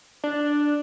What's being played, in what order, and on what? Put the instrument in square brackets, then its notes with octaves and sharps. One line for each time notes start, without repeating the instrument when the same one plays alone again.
[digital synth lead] D4